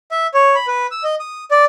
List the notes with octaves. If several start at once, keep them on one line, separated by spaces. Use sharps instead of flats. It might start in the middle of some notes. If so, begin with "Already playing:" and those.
E5
C#5
B5
B4
E6
D#5
D#6
D5